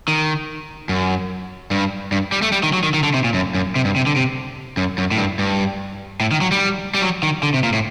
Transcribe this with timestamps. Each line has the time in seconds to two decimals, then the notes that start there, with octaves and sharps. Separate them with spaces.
0.08 D#3
0.89 F#2
1.71 G2
2.12 G2
2.32 G3
2.42 A3
2.52 G3
2.63 D#3
2.73 F#3
2.83 D#3
2.94 D#3
3.03 D3
3.14 C3
3.24 A#2
3.34 F#2
3.54 F#2
3.76 C3
3.85 G2
3.96 C3
4.06 D3
4.16 C3
4.77 F#2
4.98 F#2
5.11 A2
5.18 G2
5.39 G2
6.20 A2
6.31 D#3
6.41 F#3
6.52 G3
6.94 G3
7.02 F#3
7.23 D#3
7.43 D3
7.54 C3
7.63 A#2
7.73 A2